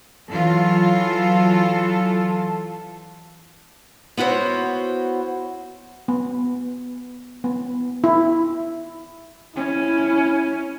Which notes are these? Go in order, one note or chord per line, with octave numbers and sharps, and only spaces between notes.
E3 F#3 F4 A4
B3 E4 F#4 C5 C#5
B3
B3
E4
C#4 E4